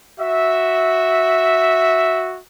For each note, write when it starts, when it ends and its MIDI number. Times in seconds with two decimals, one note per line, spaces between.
0.19 2.39 66
0.19 2.39 76